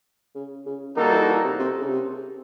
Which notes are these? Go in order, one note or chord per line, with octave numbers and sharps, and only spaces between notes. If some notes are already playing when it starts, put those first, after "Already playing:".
C#3
C#3
D#3 G3 A#3 D#4 F#4 A4
E3
E3
C3
C3
C#3
C3